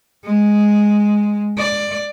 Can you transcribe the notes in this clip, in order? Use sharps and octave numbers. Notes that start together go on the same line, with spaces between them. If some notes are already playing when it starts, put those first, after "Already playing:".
G#3
D5